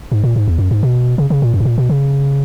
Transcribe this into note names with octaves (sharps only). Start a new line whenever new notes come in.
G#2
A#2
G#2
E2
F#2
G#2
B2
C#3
C#3
A#2
F#2
G#2
A#2
B2
C#3